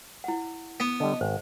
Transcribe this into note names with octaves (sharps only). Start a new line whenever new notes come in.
E4 F#5
B3
D3 G3 D#5 A5
G#1 C5